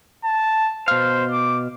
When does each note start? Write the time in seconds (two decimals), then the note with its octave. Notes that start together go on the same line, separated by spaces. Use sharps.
0.24 A5
0.88 B2 C5 F5
1.31 D6